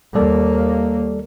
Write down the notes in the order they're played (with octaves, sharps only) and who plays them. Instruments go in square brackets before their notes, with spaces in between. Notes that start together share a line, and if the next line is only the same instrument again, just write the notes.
[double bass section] D#2 A#3 [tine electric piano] G3 A4 D5